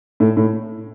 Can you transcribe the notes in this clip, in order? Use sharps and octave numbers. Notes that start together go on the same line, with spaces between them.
A2
A2